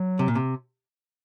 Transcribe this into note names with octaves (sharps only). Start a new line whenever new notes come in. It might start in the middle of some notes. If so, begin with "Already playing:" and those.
Already playing: F#3
C3
A#2
C3